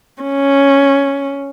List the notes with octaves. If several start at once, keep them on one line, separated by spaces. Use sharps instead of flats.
C#4